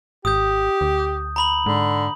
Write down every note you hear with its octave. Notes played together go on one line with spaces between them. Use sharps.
G#1 G4 D#6 G6
D2
A#5 B5 F#7
G#2 D3